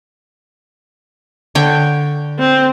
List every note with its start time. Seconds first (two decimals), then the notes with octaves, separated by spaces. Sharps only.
1.55 D3 C#5 G5
2.39 C4